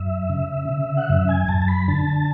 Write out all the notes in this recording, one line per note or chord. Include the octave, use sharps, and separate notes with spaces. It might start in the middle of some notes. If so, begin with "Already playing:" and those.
Already playing: F#2 E5
C#3
C#3
F#5
F#2 E5
G#5
F#2 A5
A5
B5
D3 A5